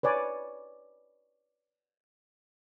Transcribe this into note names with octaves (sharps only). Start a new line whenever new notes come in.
B4 C#5 D5 G#5